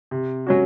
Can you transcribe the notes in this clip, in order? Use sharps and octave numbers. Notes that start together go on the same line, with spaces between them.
C3
F#3 C#4 F#4